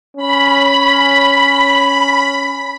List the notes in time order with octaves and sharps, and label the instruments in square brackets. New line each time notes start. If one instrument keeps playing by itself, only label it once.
[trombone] C#4 [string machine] B5